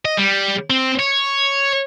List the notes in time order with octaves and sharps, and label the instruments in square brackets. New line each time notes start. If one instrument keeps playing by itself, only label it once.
[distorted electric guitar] D#5
G3
C4
C#5